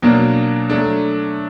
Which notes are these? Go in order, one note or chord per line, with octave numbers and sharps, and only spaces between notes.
B2 F#3 A#3 D4
F#3 A3 D4